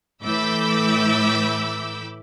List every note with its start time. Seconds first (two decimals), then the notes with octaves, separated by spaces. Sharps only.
0.23 A2 E3 B5 D6 E6 G6